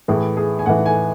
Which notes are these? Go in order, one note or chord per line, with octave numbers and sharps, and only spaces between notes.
A2 E3 G#4
G#4
G#5
A2 E3 F#5
G#5